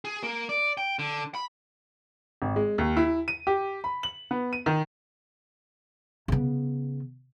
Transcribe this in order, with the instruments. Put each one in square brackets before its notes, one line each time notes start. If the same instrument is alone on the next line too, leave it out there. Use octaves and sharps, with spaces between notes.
[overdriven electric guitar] G#4
A#3
D5
G5
D3
B5
[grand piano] G#1
G#3
D#2
E4
D#7
G4
B5
F#7
B3
D#7
D#3
[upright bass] C#3 B3